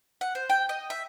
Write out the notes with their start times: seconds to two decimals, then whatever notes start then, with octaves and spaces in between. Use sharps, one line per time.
0.21 F#5
0.35 C5
0.50 G5
0.69 D#5
0.90 E5